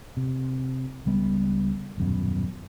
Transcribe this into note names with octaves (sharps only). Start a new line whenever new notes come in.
C3
C#2 G3 B3
D#1 F#2 B2